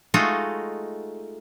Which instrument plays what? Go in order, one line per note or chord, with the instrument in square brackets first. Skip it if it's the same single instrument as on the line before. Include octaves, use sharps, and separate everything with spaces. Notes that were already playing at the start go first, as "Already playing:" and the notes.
[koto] G#3 A3 D#4 F4 F#4